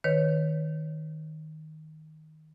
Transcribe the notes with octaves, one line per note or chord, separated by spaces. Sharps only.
D#3 B4 C#5